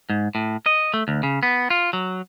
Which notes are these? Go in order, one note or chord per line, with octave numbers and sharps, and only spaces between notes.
G#2
A2
D#5
A3
D2
C#3
B3
F4
F#3